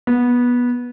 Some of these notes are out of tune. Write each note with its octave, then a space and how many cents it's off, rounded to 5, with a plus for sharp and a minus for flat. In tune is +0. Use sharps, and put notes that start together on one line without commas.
B3 -15